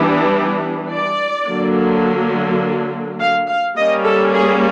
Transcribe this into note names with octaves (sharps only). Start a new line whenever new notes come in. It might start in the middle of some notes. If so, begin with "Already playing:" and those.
Already playing: E3 G3 B3 D4
D5
D3 F#3 A#3
F5
F5
G3 A#3 C#4 D#5
A4
G#4